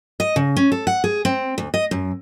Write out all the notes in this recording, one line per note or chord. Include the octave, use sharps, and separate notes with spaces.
D#5
C#3
C#4
A4
F#5
G#4
C4
D2
D#5
F#2